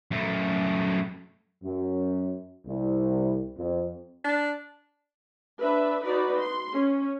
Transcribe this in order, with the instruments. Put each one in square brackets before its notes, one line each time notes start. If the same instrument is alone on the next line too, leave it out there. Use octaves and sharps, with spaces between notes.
[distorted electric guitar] F#2 A3
[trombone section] F#2
C2
F2
[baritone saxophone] D4
[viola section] D4 B4 E5
D#4 F#4 B4 D5
C6
C#4